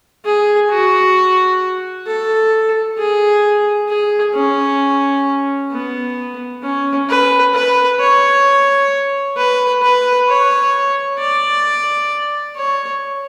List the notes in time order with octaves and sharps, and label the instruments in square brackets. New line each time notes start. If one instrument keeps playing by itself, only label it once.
[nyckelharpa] G#4
F#4
A4
G#4
G#4
C#4
B3
C#4
B4
B4
C#5
B4
B4
C#5
D5
C#5